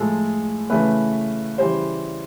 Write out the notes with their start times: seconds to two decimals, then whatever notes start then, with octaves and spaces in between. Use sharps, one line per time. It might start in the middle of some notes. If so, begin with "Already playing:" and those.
Already playing: A2 F3 G#3 A4
0.70 C#3 E3 A3 B4
1.58 C#3 E3 G3 C5